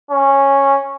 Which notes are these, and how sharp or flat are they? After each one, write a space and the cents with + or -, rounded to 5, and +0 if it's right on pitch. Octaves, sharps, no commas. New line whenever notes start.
C#4 -10